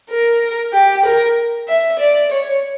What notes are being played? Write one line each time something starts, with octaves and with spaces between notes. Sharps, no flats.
A#4
G4
A#4
E5
D5
C#5